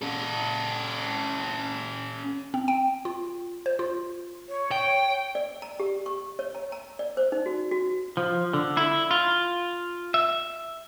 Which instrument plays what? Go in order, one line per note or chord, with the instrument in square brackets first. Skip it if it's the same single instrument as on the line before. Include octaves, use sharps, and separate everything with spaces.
[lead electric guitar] C#4 A4
[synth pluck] C4
G5
F4
C5
F4
[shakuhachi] C#5
[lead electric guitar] G5
[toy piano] D5
A#5
G4
C#6
C#5
A#5
A#5
D5
C5
D#4
F#4
F#4
[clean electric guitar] F3
D3
E4
F4
E5